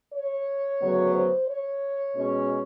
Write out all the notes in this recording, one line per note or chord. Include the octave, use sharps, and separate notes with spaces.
C#5
D2 C#3 F#3 B3
C5
C#5
B2 G#3 C#4